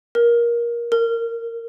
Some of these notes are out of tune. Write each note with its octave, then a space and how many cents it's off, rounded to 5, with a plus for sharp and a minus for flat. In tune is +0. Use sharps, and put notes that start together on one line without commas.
A#4 +20
A#4 -15